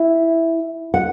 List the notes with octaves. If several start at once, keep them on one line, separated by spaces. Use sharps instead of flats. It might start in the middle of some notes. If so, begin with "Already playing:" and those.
Already playing: E4 E5
F#5